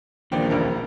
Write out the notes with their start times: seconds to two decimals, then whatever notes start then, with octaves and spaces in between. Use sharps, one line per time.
0.32 A#1 E2 A#2 D#3 B3 D5 G5
0.50 E1 D2 A#4